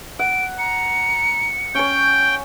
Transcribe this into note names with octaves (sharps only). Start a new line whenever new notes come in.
F#5 D7
A#5 C#7
C#4 C#5 G5 G6